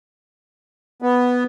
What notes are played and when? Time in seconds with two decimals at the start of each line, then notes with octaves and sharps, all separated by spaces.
1.02 B3